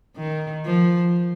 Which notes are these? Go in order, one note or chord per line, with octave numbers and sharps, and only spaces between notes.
D#3
F3